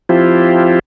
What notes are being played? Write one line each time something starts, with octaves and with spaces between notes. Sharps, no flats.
F3 C4 E4 F4 G4